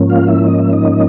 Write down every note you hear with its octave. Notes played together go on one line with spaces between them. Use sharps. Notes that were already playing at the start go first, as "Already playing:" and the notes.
Already playing: G#2 F3 A#3 C#4
F4 F5
E4 E5
D#5
E5
D#4 D#5